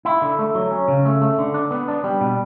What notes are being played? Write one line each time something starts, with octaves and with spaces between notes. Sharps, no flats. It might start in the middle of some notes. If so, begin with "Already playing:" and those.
E4
D3
A3
F#3
C#4
C#3
A3
A3
D3
D4
B3
D4
G3
B2